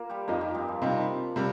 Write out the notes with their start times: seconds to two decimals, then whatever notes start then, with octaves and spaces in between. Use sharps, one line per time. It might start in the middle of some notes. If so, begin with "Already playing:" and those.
Already playing: A#3 F4 A#4
0.10 G3 G4
0.28 F2 F3 A#3 D#4 A#4
0.41 G3 G4
0.55 G2 G3
0.68 F3
0.82 C3 F3 G3 D#4
1.36 C3 G3